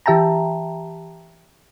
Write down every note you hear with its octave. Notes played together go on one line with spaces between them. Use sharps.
E3 G4 E5 G5 A5 A#5